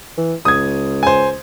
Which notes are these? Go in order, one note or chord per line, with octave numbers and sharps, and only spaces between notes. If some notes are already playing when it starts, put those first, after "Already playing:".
E3
C#2 D#6 G#6
C5 G#5